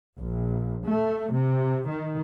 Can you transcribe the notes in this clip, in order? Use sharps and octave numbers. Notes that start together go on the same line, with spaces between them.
A#1
A3
C3
D#3